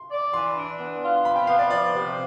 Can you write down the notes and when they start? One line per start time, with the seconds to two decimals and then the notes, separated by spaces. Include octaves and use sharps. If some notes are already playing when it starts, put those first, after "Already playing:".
Already playing: C6
0.11 D5
0.33 E3 C6
0.56 D4
0.80 B3
1.02 F4
1.25 C3 B5
1.36 G5
1.47 B3 F5
1.59 D5
1.70 F3 D5
1.93 C3